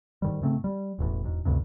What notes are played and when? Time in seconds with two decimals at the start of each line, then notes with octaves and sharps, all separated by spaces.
0.22 G#2 D#3 G3
0.42 G#2 C#3 A3 C4
0.64 G3
0.99 E1 A1 E2
1.24 E1 G#2
1.45 A1 D2 G2 C3